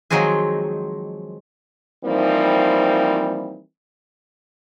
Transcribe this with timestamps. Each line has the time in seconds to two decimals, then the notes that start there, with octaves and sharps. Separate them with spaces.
0.10 D#3 F3 F#3 G#3 C4 G#4
2.04 E3 F3 G3 A#3 C4 D#4